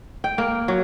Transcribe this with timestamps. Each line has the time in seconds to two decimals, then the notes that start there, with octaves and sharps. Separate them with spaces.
0.24 G5
0.38 A#3
0.68 F#3